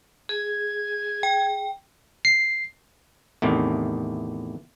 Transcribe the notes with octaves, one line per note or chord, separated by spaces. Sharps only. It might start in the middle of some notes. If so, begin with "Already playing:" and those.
G#4 G#6
G5
C7
E2 A2 C3 D#3